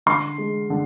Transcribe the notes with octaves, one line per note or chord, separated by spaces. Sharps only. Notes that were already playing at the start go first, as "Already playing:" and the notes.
D3 C6
G#3
D3